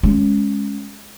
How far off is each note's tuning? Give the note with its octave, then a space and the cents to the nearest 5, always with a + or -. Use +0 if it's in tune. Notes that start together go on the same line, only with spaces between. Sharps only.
G#3 +0 C#4 +0